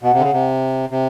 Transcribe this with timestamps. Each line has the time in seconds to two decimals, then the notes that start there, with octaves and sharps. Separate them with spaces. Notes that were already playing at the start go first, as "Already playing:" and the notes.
0.03 B2 F#5
0.13 C3
0.19 D3
0.22 C#3
0.33 C3
0.91 C3